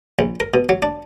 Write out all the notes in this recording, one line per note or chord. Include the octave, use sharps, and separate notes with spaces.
A#1
A#4
B2
F#3
D4